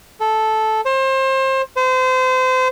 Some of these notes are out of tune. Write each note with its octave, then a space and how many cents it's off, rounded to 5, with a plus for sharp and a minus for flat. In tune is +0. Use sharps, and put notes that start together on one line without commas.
A4 -10
C5 +30
C5 -30